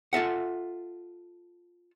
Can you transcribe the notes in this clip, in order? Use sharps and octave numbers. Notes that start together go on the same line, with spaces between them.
F4 A4 E5 F#5